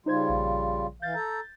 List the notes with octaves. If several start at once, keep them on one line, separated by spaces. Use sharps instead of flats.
C#3 G3 D#4 F4 C5 G#6
A#1
E3 F5 G6 A6
A4 A#5